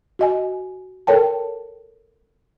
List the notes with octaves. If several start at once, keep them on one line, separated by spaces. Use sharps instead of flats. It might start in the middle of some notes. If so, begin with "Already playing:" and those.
F#4 D#5 G#5
A4 A#4 C#5 G5 A5